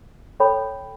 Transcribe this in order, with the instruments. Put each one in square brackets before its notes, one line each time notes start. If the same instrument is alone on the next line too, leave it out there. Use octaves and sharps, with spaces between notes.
[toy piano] A4 C#5 G5 B5